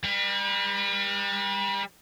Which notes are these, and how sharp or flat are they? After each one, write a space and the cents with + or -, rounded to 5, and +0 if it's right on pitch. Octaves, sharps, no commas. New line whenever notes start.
G3 +30 B4 -40